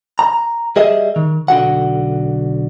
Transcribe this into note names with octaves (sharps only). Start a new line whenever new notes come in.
A#5
G3 G#4 D#5 E5
D#3
B1 D3 F#4 F#5